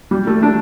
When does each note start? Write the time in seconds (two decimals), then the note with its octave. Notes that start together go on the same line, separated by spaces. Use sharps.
0.11 G3
0.27 A3
0.43 D4